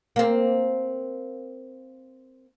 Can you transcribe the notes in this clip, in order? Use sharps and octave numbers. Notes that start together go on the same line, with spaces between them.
A#3 C4